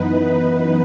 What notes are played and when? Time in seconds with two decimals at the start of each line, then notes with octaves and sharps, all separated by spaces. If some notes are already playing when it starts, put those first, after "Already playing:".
Already playing: F#2 E3 B3 D#4 B4
0.43 B4